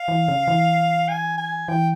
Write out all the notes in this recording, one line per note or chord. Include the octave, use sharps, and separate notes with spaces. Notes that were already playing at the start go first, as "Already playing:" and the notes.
Already playing: F5
E3
C#3
E3
G#5
G#5
E3 G5